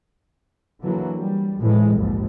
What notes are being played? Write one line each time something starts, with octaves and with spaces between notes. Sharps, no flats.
D3 E3 F#3 A#3
G3
A2 E3 G#3
A#1 D#2 G#2